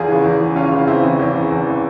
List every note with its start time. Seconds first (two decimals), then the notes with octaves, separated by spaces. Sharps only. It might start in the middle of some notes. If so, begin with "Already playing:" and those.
Already playing: E2 F4 G#4
0.08 C#3 E3
0.24 E2
0.41 C#3 E3
0.56 E2 C#4 F4
0.72 C#3 E3
0.79 F4
0.87 E2 C4 E4
1.04 C#3 E3
1.19 E2
1.34 C#3 E3
1.51 E2
1.67 C#3 E3